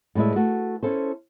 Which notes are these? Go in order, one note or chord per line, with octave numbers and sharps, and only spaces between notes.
A2 G3 G#3 B4 E5
A3 F#4
C#4 E4 A4 C5